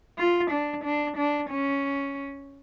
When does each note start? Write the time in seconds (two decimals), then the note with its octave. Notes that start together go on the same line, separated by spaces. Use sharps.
0.18 F4
0.51 D4
0.84 D4
1.17 D4
1.50 C#4